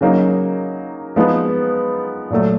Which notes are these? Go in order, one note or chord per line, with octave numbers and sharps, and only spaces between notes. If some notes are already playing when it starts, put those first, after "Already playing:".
C#3 F#3 A#3 D#4
F3 G#3 B3 D#4
A#2 F#3 A3